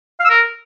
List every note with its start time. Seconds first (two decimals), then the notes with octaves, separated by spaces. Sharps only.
0.20 F5
0.25 E6
0.30 A#4